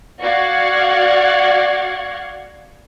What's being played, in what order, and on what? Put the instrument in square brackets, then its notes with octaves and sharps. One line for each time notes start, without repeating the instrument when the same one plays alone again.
[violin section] F#4 D5 F5 F#5 C#6 G#6